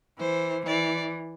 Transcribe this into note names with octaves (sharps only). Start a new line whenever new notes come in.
E3 C5
E3 D5